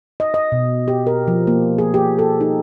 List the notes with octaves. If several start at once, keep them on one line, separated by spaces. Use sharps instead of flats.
D#5
D#5
B2
G4
A#4
F3
A#3
G#4
G4
A4
D#4